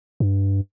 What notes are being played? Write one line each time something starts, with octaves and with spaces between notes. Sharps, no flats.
G2